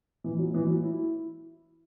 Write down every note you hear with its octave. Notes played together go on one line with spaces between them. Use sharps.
E3
F#3
E3
F#3
E4